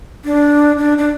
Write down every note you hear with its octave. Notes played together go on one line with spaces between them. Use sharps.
D4
D4
D4